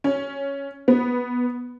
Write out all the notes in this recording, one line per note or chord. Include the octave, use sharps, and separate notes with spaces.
C#4
B3